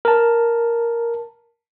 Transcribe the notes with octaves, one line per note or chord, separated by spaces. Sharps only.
A#4 A5